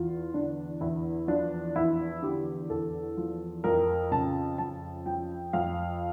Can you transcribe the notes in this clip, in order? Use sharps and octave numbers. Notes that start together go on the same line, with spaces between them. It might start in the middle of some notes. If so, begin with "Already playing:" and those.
Already playing: E2 F4
D3 D4
E2 E4
F3 D4
E2 E4
D3 G4
E2 A4
F3
F2 A#4
C#3 A5
F2 A5
F3 G5
F2 F5